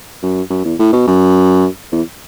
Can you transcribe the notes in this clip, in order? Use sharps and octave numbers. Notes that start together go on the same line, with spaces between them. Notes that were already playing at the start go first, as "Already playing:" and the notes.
F#2
F#2
E2
A2
B2
F#2
E2